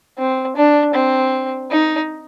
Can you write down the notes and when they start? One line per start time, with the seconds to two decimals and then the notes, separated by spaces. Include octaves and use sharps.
0.18 C4
0.56 D4
0.94 C4
1.71 D#4